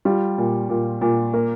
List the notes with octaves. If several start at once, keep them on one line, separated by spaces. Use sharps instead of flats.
G3 F4
A#2
A#2
A#2
A#3